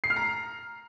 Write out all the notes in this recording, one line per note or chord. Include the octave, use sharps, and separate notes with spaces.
C7
F6
A#5